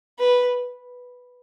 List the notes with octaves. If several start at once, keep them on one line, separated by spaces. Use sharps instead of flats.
B4